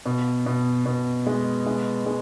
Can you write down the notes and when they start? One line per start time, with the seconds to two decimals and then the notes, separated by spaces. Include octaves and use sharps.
0.06 B2
0.46 B2
0.86 B2
1.27 G#3
1.66 G#3
2.06 G#3